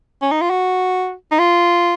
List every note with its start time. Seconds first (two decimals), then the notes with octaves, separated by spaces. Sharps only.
0.22 C#4
0.31 D#4
0.41 F4
0.50 F#4
1.31 D#4
1.39 F4